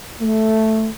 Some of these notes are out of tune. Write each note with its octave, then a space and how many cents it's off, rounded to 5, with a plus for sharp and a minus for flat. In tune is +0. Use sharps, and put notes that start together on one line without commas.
A3 +0